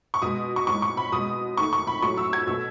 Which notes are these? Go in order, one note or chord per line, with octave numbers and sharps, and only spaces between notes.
C#6
B2 G#3 D#6
C#6
A2 G#3 C#6
C#6
B5
B2 G#3 D#6
D#3 A3 C#6
C#6
B5
A2 F#3 A3 C#6
E6
G#6
B2 A3 E6